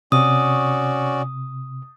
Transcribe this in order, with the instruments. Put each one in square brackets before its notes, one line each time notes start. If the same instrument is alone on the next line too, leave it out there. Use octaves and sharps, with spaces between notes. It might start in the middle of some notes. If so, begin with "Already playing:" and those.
[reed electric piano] C3 [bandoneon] C#4 F#4 D5 [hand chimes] D#6